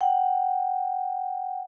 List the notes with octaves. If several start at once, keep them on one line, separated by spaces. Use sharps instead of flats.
F#5 G5